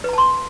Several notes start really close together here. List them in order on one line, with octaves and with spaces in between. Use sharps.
B4 A#5 A5 C6